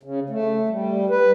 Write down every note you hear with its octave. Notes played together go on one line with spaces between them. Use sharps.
C#3
A3
G3
B4